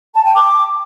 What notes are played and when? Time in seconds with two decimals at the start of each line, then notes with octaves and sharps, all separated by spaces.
0.15 A5
0.25 G5
0.35 D6